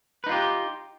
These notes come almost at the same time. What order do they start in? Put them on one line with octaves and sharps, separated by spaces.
B4 D#4 F4 G4